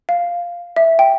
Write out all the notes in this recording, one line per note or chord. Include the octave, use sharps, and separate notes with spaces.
F5
E5
G5